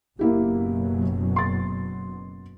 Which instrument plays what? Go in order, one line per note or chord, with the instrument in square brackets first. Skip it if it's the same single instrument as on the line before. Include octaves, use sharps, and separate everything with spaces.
[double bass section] F#1 B2 F#3 [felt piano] A#3 E4 G4
[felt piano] C6 A6